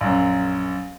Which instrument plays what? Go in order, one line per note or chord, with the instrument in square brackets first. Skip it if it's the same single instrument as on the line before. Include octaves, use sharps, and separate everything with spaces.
[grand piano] A#1 F#2